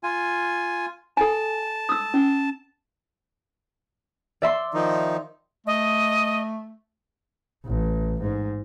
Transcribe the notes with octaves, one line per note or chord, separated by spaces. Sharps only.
F4 G#5
A4 G#5 A5
D#6 E6
C#4
D5 E5 C6
D#3 F3 D#4
A3 D#5
A1
G#2